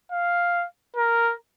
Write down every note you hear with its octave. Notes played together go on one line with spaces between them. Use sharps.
F5
A#4